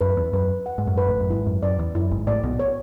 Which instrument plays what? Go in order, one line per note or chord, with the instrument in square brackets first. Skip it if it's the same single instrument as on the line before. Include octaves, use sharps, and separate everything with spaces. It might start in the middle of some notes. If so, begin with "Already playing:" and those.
[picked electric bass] F#2 [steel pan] B4
[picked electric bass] E2
[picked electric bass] F#2 [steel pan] B4
[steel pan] F#5
[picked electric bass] G#2
F#2
[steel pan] B4
[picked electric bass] A1 A2
F#2
[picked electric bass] G#1 G#2 [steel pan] E4
[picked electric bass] F#2
[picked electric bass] F#2 [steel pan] D5
[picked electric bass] E2
[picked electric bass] F#2 [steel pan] E4
[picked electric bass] G#1 G#2
[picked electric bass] A1 A2 [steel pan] D5
[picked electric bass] B1 B2
[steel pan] C#5